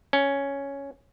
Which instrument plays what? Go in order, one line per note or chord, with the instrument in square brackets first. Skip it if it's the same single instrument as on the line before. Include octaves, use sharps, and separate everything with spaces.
[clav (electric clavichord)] C#4